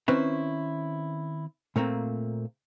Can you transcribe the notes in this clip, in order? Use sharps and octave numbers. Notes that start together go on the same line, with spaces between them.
D#3 C4 C#4 E4 B4 C5
A#2 A3 A#3 C4